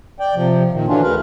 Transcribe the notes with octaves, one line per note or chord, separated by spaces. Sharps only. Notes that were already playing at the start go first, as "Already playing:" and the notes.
D5 G5
C3 F3
A#2 D#3
D3 E3 F#3 C#4 D4 F4
D2 C#3 A#4 B4